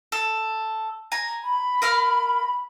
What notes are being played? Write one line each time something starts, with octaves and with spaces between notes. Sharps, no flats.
A4
G#5 A#5
B5
A#4 F5 F6